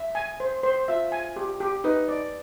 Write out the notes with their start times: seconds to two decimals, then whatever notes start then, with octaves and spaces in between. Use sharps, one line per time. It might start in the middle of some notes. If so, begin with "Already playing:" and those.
Already playing: E5
0.15 G#5
0.40 C5
0.63 C5
0.88 F4 E5
1.12 G#5
1.36 G4
1.60 G4
1.84 D#4 B4
2.08 D5